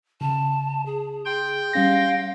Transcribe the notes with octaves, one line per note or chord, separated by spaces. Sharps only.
C#3 A5
G#4
G#4 G5 C6 G6
G3 C#4 F5 A#6